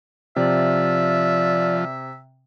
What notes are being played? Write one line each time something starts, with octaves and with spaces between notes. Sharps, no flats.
C3 F3 D5 E5